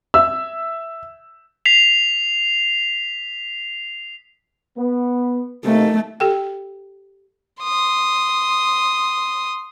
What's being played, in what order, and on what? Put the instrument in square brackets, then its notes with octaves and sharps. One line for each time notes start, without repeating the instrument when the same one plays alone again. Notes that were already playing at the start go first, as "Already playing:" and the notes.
[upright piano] E5 E6
[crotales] B6 C7 F7
[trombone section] B3
[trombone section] C3 A#3 D#4 [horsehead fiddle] A3
[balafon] G4 A4 G5
[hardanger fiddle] C6 D#6